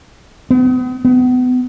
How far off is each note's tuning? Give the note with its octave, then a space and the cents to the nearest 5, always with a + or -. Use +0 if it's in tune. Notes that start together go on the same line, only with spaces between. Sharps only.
B3 +40
B3 +30